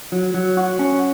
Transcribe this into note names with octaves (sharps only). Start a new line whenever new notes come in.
F#3
F#3
F#4
C#4